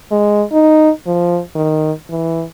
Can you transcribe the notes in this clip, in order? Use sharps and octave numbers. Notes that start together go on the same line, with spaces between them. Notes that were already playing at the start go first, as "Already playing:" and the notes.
G#3
D#4
F3
D#3
E3